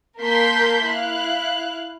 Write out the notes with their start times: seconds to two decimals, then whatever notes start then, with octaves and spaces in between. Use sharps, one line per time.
0.20 A#3 A#4 A5 C6 G6 B6
0.86 E4 F5 F#6